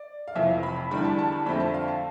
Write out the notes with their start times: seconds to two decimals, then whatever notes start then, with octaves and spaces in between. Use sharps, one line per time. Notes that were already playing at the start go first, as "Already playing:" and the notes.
Already playing: D5
0.28 F5
0.35 F1 F2 E3 E5
0.63 B5
0.91 E2 D3 G3 B5
1.04 A5
1.19 A5
1.33 B5
1.46 F2 D3 A3 C4 B5
1.60 A5
1.74 F5
1.88 A5